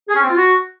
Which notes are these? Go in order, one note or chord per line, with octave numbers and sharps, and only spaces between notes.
G#4
C#4
C4
F4
F#4